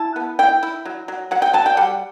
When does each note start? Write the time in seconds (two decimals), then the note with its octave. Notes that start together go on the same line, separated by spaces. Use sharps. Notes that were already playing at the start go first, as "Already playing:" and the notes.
Already playing: E4 A5
0.16 B3
0.39 E4 G5
0.63 E4
0.85 F#3
1.08 F#3
1.31 F#3 F#5
1.42 G5
1.53 F#3 A5
1.66 G5
1.77 G3 F#5